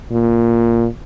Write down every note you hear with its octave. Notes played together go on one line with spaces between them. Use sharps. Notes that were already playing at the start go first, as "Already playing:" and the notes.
A#2